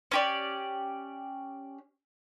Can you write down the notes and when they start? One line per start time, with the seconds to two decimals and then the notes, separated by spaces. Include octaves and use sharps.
0.11 C#4 G4 D5